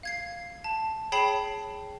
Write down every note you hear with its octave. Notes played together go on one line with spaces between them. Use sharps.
F5 G#6 C7
A5
G#4 C#5 G5 A5 B5 C7